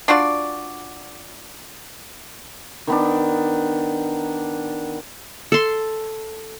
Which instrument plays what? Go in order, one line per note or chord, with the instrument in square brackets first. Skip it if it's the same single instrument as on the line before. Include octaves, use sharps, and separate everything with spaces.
[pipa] D4 F4 F#4 D5
[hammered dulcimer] D#3 B3 D4
[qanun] A4 C6